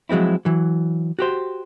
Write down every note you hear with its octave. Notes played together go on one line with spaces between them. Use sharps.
F3 F#3 G#3 C4 E4
E3 F#3
F#4 G4 C5